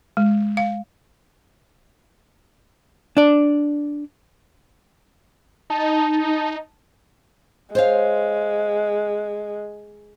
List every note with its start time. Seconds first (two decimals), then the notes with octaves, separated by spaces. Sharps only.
0.17 G#3
0.57 F5
3.17 D4 D5
5.70 D#4 A5
7.75 G#3 C5 C#5 F5